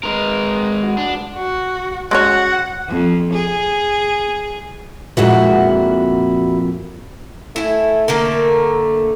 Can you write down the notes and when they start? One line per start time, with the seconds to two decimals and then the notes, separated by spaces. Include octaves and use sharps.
0.03 G#3 A#4 B4
0.83 F#4
0.98 D4
1.36 F#4
2.11 G#3 C#4 F#4 C#5 F#5
2.88 F2
3.32 G#4
5.17 F2 A#2 G#3 E4 F#4
7.56 A3 E4 G#5
8.08 D3 A3 A#3 A#4